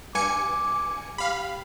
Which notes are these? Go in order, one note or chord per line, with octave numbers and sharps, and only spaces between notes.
G2 G#5 D6 C#7
G4 F5 B5